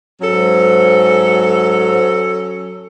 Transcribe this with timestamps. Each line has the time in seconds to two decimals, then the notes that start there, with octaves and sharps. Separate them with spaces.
0.21 G#2 F#3 C#4 A4